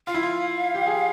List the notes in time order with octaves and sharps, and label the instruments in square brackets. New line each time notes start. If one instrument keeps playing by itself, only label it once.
[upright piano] F4 [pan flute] F5
[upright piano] E4
F4
G4
G#4